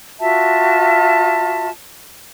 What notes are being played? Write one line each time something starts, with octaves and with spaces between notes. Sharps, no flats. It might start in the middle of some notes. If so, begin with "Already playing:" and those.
F4 F#4 E5 A5